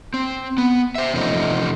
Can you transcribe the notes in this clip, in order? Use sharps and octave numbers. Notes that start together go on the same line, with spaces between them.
C4
B3
C5 E5
E2 C3 F3 A3 C#4 D#4